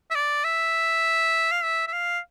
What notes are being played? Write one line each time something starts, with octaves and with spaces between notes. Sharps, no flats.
E5
D5
E5
F5
E5
E5
F5